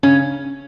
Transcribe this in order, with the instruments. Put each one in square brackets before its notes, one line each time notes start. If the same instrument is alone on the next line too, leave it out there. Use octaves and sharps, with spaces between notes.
[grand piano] C#3 [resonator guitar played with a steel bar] C#4